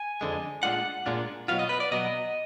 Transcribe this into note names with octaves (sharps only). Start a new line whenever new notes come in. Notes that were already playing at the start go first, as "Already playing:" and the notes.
Already playing: G#5
F2 D3 G#3
A#2 G#3 D4 F4 F#5
A#2 G#3 D4 F4
B2 F#3 B3 F4 F5
D#5
B4
D5
B2 F#3 B3 D#5